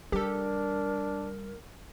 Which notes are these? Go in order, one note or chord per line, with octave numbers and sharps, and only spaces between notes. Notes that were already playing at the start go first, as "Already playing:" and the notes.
G3 D4 G4 A4 A#4